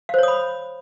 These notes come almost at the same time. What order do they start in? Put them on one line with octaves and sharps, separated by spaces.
F5 C5 C#5 D#6 B5